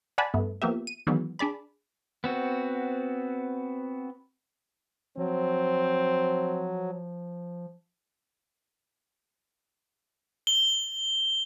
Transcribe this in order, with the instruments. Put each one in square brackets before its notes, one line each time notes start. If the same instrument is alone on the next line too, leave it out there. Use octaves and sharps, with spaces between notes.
[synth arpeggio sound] D5 F#5 G#5 A5 B5
G2 A3 B3
F3 A#3 B3 G4 E5
D#7
D#3 E3 F#3 G#3 B3
D4 G#4 D5 B5
[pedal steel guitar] B3 C4 F#4
[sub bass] F3 [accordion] F#3 [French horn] C4
[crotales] G7